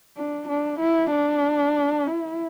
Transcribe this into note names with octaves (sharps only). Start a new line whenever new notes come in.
D4
D4
E4
D4
E4